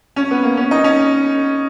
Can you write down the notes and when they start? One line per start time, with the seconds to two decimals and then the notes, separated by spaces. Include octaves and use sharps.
0.16 C#4
0.31 B3
0.43 A#3
0.57 C#4
0.71 D#4
0.84 C#4